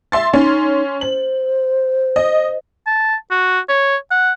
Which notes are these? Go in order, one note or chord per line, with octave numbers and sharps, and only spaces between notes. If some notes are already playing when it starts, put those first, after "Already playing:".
E5 C6 A6
C#4 D#4 C6
C5 F#7
D#5
A5
F#4
C#5
F#5